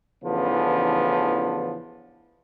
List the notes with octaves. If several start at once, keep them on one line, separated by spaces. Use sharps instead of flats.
A1 C#3 E3 F3 B3 D4